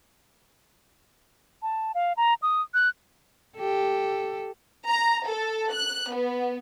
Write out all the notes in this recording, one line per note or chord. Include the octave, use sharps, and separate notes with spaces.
A5
F5
A#5
D#6
F#6
G4 A4
A#5
A4
F#6
B3